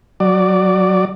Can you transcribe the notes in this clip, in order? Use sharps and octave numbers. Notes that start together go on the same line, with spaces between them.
F#3 D5